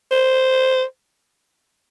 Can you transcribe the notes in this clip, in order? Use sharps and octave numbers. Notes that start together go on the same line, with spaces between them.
C5